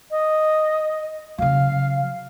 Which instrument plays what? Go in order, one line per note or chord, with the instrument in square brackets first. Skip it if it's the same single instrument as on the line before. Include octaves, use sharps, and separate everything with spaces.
[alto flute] D#5
[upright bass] C#3 F#3 [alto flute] F5